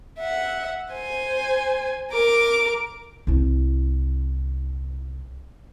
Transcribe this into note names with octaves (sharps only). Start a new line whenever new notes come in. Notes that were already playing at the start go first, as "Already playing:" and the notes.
E5 F#5
C5 G#5
A#4 D6
C2 E4